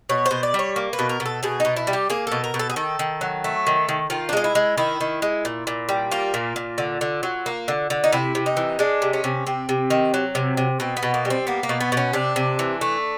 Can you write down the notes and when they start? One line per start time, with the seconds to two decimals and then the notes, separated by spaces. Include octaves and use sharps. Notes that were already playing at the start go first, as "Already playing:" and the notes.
0.09 B2 C#5
0.26 C5
0.31 B2
0.43 D5
0.54 G3 C#5
0.76 A#3
0.93 B4
0.99 B2
1.09 A#4
1.20 B2
1.26 A4
1.43 B2 G#4
1.60 B2 D#4
1.77 E4
1.87 G3
1.93 G4
2.10 A#3 G#4
2.27 B2 A4
2.44 A#4
2.54 B2
2.59 A4
2.70 G#4
2.76 D#3 A4
2.99 D#3
3.21 F#3
3.44 A3
3.67 D#3
3.89 D#3
4.10 D#3 F4
4.29 D4
4.33 G#3 D#4
4.44 E4
4.55 G#3
4.78 D#3 E4
5.01 D#3
5.22 G#3
5.45 A#2
5.67 A#2
5.89 G3
6.11 A#3 F4
6.34 A#2
6.56 A#2
6.78 D3
7.01 D3
7.23 F#3
7.46 A#3
7.68 D3
7.90 D3
8.04 D#4
8.12 C3 E4
8.35 C3
8.46 D#4
8.57 E3
8.79 G#3 D4
9.02 C3
9.13 C#4
9.24 C3
9.47 C3 C4
9.69 C3
9.90 D#3
10.14 F#3
10.35 C3
10.57 C3
10.80 B2 C4
10.97 B3
11.03 B2
11.14 A#3
11.25 G3
11.30 C4
11.47 A#3 B3
11.63 A#3
11.69 B2
11.80 B3
11.92 B2
11.97 C#4
12.13 C3 D4
12.36 C3
12.59 E3
12.81 A3